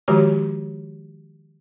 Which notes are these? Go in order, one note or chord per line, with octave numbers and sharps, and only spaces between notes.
D#3 F3 G#3 F#4 G4 C#5